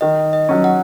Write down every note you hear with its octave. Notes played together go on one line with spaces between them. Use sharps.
D#3 D#5
D#5
F#3 C#4
F#5